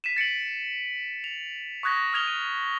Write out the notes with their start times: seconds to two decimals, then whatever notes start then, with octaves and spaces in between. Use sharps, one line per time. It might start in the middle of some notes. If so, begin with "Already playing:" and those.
0.04 B6 D#7 E7
0.17 A6 C#7 D7 F#7
1.24 F7
1.83 C#6 D#6 F#6 G#6 A#6
2.13 D#6 F6 G#6 F7 G7
2.27 D#7